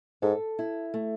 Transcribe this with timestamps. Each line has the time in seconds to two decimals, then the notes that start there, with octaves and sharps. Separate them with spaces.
0.22 G#2 A4
0.59 E4
0.94 A3